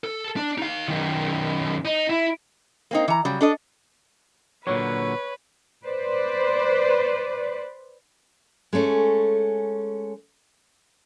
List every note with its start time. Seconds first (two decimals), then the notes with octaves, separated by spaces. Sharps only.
0.04 A4
0.37 D4
0.58 D#4 F5
0.88 F#2 D#3
1.85 D#4
2.09 E4
2.91 A#3 C4 D#4
3.08 E3 A#5
3.25 C#3 F#3 G3
3.41 D4 A4 D#5
4.67 A#2 D3 F#3 B4 C#5
5.85 B4 C5 D5
8.73 G#3 A3 C#4 A4